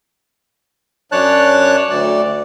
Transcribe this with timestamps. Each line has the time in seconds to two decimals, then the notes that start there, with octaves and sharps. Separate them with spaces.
1.12 F#2 D4 C#5 A5 F#6
1.90 D2 D5